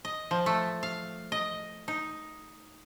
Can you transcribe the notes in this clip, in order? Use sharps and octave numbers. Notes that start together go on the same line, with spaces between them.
D#5
F3
A3
F5
D#5
D#4